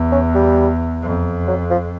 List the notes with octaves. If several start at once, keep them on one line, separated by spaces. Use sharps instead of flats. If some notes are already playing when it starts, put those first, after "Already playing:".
Already playing: E2
C#4
G3
F2
F#3
F3